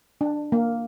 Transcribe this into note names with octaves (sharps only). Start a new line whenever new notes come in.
D4
A#3